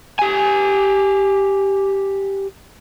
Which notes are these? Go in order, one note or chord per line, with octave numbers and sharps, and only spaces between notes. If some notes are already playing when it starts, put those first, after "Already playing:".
G4 G#5